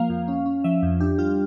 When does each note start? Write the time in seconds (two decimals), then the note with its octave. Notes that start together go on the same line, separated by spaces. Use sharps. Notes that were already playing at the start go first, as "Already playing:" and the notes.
Already playing: F3 A#3 F5
0.10 F2
0.28 C#4
0.46 C#4
0.64 F3 E5
0.83 F2
1.00 D4 G4
1.18 G3 F4